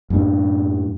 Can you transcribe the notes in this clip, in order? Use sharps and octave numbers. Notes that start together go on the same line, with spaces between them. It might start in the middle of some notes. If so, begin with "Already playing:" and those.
F#2 A2 D4